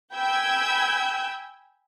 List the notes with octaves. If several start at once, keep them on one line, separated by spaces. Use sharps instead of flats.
G5 G#5 B5 E6 G6 G#6